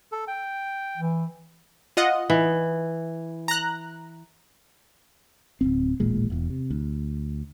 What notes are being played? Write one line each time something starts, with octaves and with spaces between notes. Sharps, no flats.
A4
G5
E3
F4 D#5 F#5
E3
A#5 F#6
D1 G#1 C4
D#1 A1 A#2 G#3
E1 E2
C3
D2